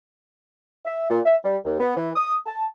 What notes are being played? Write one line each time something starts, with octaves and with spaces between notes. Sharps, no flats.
E5
A#2
E5
G3
D#2
B3
E3
D#6
A5